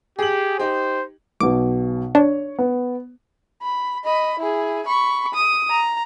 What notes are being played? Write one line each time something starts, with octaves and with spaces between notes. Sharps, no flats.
G4 G#4 F#7
D#4 G4 C5
B1 B2 D6
D4 C#5
B3
B5
D#5 B5
E4 G#4
B5 C#6
D#6
A#5